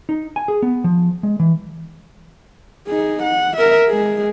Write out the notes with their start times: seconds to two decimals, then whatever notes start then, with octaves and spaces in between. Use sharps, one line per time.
0.09 D#4
0.36 G#5
0.48 G#4
0.62 B3
0.84 F3
1.23 G#3
1.40 E3
2.87 D#4 G#4
3.23 F#5
3.56 A#4 E5
3.89 G#3 G#4